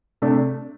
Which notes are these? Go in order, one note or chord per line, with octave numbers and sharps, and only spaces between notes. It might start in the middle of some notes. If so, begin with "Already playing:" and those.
C3 A3 D4